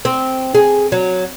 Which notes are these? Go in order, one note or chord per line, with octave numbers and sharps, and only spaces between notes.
C4
G#4
F#3